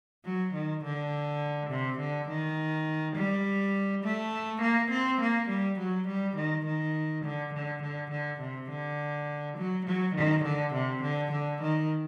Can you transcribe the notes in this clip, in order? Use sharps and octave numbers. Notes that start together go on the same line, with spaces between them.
F#3
D#3
D3
C3
D3
D#3
G3
A3
A#3
C4
A#3
G3
F#3
G3
D#3
D#3
D3
D3
D3
D3
C3
D3
F#3
F#3
D#3
D3
C3
D3
D3
D#3